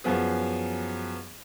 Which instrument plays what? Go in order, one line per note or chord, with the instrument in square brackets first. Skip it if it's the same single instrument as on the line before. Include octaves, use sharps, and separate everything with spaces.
[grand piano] F#2 F3 B3 G#4